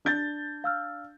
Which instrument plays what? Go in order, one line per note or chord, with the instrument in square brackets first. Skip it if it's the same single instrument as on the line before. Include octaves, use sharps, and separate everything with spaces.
[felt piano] D4 G6 A6
[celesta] F5 E6 F6